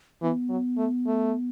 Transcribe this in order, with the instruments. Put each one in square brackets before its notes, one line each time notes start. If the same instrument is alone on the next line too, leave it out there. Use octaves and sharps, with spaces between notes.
[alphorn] E3 [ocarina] B3
[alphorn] F#3
A3
A3